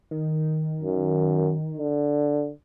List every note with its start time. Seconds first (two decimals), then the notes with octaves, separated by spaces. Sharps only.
0.11 D#3
0.82 F#2
1.77 D3